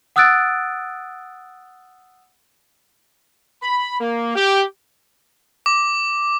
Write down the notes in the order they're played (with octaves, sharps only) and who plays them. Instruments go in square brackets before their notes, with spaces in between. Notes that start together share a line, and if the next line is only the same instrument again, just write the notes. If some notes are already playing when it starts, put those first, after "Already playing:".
[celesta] F#5 D#6 E6 F#6 A6 D7
[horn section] B5
A#3
G4
[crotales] D6